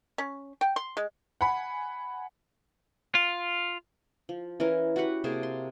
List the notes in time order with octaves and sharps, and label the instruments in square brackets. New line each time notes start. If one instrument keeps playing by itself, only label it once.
[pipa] C#4
G5
C6
G#3
[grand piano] F#5 G#5 B5
[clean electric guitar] F4
[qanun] F3
E3 C#4 E4 A#4
F#4 G4 B4 F#5
C3 A#3 G#4 A5
C6